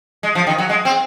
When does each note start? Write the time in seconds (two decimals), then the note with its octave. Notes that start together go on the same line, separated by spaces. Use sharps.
0.23 G#3
0.35 F3
0.47 D#3
0.58 F#3
0.69 G#3
0.85 C4